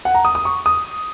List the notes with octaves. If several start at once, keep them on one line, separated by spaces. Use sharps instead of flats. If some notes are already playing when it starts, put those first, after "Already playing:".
F#5
A#5
D#6
D#6
C#6
D#6